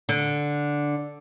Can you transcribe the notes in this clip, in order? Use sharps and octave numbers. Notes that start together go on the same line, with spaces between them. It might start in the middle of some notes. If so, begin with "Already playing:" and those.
D3